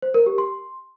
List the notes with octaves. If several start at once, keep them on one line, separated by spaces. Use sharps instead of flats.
C5
A#4
G4
C6